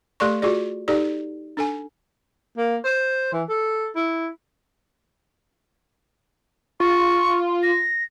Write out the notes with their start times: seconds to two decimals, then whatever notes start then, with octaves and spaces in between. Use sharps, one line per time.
0.20 A3 G4 A4 D5 C6 C#6
0.42 F4 F#4 G#4 D5
0.88 D#4 G4 A4 D5
1.57 D4 A4 G#5
2.57 A#3
2.84 C5
3.33 E3
3.49 A4
3.96 E4
6.80 F4 C#6
7.63 A#6